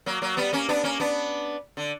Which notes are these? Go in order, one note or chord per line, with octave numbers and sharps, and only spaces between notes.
F#3 A#3
F#3 A#3
G3 B3
A#3 C#4
B3 D4
A#3 C#4
B3 D4
D3